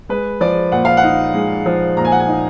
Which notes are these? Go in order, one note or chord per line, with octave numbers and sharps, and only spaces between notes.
G#3 B4
F3 D5
A#2 F#5
F5
F#5
D#4
G#3
F3
A#2 A#5
G#5
F#5
G#5
D#4